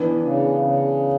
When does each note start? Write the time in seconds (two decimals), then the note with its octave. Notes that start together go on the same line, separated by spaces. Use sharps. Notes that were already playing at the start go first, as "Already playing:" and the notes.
Already playing: E3 B3 D4
0.23 C#3
0.60 C#3